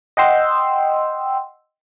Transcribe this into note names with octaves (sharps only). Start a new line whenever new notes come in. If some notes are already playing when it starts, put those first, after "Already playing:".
D#5 F#5 G5 C6 E6